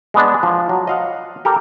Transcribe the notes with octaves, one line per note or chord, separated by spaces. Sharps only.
G#3 B3 D4
F3
F#3
D#5 F5 F#5
G4 A4 A#4